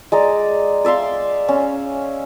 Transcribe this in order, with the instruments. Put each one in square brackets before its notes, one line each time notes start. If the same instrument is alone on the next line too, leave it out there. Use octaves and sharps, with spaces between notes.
[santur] G#3 D5 A#5
D5 E5 F5 C6
C#4